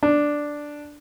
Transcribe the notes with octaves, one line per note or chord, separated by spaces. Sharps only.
D4